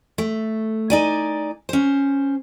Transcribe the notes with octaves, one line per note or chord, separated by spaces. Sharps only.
A3
D#4 D5 G#5
C#4 C5